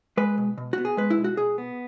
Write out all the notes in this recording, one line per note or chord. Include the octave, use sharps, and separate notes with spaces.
G#3 B4
B2
B2
B3 F#4
G#4
G#3 B4
E4
B2
F#4
B2 G#4
B3